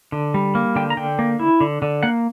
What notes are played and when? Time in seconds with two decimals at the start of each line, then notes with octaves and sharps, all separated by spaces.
0.12 D3
0.34 G3
0.55 A#3
0.76 D3 G5
0.90 A#5
0.97 D3 G5
1.19 A#3
1.39 E4
1.61 D3
1.82 D3
2.03 A#3 F#5